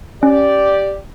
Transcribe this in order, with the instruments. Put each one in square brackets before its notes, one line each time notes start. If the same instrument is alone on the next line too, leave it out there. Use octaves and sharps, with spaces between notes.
[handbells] C#4 [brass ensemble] G4 D5